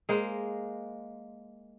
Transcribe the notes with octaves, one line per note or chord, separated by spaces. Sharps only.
G#3 A#3 C5